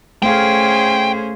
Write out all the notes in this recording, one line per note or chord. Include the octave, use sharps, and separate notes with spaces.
A3 C#4 G#4 C5 F5 G5